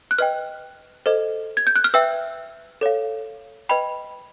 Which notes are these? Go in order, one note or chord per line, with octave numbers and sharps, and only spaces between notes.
F#6
B4 D#5 G5 F6
A4 C5 D#5
G#6
G6
F#6
F6
B4 E5 G5 E6
A4 C#5 F5
B4 D#5 G5 B5